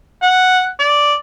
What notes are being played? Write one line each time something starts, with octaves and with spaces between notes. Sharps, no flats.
F#5
D5